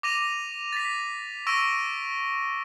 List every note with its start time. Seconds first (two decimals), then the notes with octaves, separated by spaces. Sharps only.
0.03 D6 A#6 D#7 F7
0.72 A6 B6
1.47 C#6 E6 A#6 D7 D#7